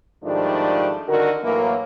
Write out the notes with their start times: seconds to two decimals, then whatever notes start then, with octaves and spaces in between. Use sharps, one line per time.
0.24 G#2 D#3 F3 G3 A3 D4
1.08 D3 D#3 F#4 A#4
1.43 A2 E3 F#3 A#3